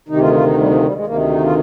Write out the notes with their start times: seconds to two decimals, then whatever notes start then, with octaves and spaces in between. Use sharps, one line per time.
0.08 D2 C3 D#3 D#4
0.16 G4
0.21 F4
0.33 F4
0.45 D#4
0.58 G3
0.70 F3
0.82 G3
0.94 G#3
1.06 D2 C3 D#3 A#3
1.31 D#4
1.43 F4